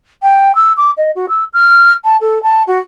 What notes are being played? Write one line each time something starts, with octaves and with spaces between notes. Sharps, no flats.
G5
E6
D6
D#5
F#4
E6
F6
A5
A4
A5
F#4